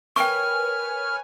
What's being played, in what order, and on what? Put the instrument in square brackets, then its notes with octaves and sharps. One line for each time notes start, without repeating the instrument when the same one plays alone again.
[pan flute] A#4 [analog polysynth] B4 C#5 G#5 [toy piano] G5 C#6 [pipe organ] F6